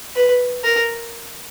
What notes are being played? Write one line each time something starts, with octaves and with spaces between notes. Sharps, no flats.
B4
A#4